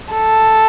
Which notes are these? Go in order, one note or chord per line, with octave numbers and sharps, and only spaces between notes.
A4